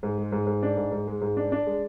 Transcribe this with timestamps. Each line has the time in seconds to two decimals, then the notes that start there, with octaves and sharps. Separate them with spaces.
0.03 G#2
0.18 G#3
0.32 G#2
0.47 G#2
0.63 D4
0.77 G#2
0.92 G#2
1.07 G#3
1.21 G#2
1.37 D4
1.52 D4
1.66 G#3